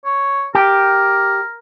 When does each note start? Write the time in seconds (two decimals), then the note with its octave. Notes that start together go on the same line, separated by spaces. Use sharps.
0.05 C#5
0.55 G4 A#4